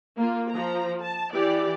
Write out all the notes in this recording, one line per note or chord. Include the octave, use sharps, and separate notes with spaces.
A#3 F4
F3 A#5
A5
E3 G4 D5